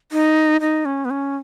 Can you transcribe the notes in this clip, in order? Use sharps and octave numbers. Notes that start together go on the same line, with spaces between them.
D#4
D#4
C#4
B3
C#4